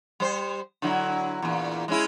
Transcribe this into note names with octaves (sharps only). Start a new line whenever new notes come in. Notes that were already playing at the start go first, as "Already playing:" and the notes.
G3 C5
D3 F#3 E4
E2 A#2
G#3 C#4 E4